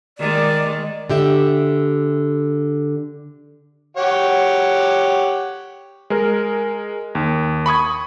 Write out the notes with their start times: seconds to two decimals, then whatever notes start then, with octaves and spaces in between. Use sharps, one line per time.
0.18 D#3 G#3 D5
1.10 D3 G4 E5
3.97 G4 C#5 F#5
6.10 G#3 A#4
7.15 D#2
7.66 B5 C#6 D#6 G#6